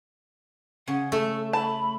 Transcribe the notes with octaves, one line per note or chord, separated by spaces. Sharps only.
C#3 C#4 F#5
A3 A4
A5 B5